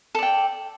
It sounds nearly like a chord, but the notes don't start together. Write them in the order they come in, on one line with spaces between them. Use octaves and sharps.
A4 D5 G5